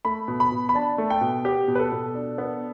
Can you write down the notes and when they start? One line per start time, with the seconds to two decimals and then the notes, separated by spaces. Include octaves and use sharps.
0.05 A3 B5
0.28 B2
0.40 B5
0.52 B2
0.69 B5
0.74 D4 A5
0.98 A3
1.10 G5
1.21 B2
1.45 B3 G4
1.68 B2
1.75 B4
1.79 A4
1.92 B2
2.15 D4
2.38 B3